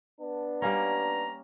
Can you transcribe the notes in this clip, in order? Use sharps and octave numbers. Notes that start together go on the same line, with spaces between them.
B3 D4
G3 A#3 C#4 A#5